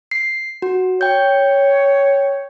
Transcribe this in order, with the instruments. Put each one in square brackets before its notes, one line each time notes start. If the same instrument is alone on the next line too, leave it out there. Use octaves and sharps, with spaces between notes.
[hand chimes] C7
F#4
[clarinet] C#5 [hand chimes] G5 G6